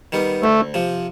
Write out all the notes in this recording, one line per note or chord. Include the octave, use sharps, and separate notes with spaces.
D#3 G3 B3
D2 A3
C3 F3